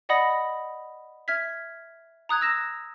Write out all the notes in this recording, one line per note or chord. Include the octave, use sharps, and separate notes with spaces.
D5 D#5 F#5 B5 D#6 A#6
E5 F6 G#6 B6
A#5 D#6 F#6 G#6
E6 A#6 E7